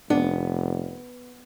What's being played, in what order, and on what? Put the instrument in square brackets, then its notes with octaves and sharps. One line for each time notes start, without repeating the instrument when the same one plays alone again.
[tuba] F1 [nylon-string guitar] B3 [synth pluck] D4